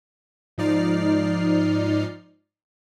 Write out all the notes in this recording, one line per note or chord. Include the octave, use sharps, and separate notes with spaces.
G#2 F3 D#4 D5 F6 C7